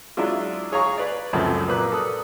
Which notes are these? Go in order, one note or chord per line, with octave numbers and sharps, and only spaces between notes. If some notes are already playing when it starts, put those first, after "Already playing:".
F#3 G#3 D4 E4 F4
G#4 C#5 F5 G#5 A#5 C#6
B4 D5
C#2 F#2 F3 A3 C4
A#2 A#3 B4 D6 F#6
A4 D#6